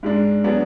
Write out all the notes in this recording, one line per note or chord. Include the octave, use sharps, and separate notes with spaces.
G#2 G#3 D4
F#3 B3 D4 G#4